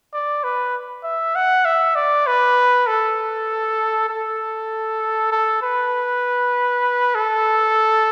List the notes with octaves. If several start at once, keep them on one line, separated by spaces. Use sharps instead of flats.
D5
B4
E5
F#5
E5
D5
B4
A4
A4
A4
B4
A4